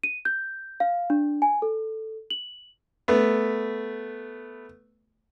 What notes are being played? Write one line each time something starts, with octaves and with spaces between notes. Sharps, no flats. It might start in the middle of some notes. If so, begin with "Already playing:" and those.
D#7
G6
F5
D4
G#5
A4
F#7
A3 B3